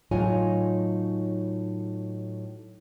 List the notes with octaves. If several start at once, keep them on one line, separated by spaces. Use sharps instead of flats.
A2 F#3 D#4 F4 C#5 G#5